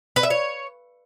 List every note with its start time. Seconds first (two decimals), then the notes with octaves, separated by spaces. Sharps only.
0.16 B4
0.23 E5
0.30 C#5